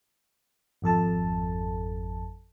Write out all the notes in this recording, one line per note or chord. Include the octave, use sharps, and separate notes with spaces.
G#1 F2 A4 A5